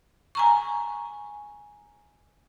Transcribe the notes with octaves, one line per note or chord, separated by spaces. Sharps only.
G#5 A#5 C#6